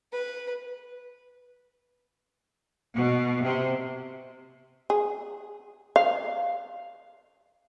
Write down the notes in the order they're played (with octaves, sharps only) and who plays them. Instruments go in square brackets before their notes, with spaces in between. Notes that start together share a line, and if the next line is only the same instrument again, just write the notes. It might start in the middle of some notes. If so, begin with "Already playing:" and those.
[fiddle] B4
[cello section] B2
C3
[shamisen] G#4
F5